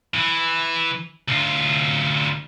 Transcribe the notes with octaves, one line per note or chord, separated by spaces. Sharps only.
E3
D2 F4